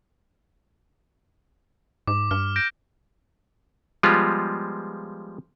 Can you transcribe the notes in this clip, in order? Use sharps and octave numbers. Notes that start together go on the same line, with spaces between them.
G#2 D6
G2 F6
G6 A#6 D7
F3 G3 G#3 B3 F4